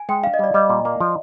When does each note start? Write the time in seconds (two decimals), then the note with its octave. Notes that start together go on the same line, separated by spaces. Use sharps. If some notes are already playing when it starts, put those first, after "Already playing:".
Already playing: G#5
0.09 G#3 G5
0.23 D4 F5
0.34 D#5
0.39 G3 D5
0.54 G3 D#5
0.70 A#2
0.85 A#3
1.00 F3